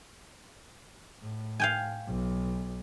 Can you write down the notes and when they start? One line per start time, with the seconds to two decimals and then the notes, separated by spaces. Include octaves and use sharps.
1.21 A2
1.60 F5 G5 G#5
2.07 B1